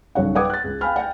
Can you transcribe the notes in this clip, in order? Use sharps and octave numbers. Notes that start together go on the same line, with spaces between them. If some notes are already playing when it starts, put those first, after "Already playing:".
B1 G2 C#3 C#5 F#5
B4 F#5 G5 D6 D#6 G#6
F#6 A6
C#2
F5 G5 G#5 B5 F6
F#5 G5